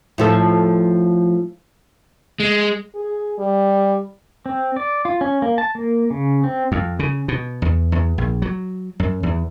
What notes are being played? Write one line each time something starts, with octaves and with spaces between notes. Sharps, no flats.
A2 F3 A4
G#3
G#4
G3
C4
D5
F4
C#4
A#3
A5
A#3
C#3
C4
F2
C#3
B2
E2
E2
A#1
F#3
F#2
E2